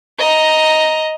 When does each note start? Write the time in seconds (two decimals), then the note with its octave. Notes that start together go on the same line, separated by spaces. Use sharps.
0.19 D#5 A#5